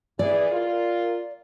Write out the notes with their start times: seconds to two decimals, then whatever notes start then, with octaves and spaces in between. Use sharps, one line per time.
0.19 E3 G#4 D5
0.52 F4 A#4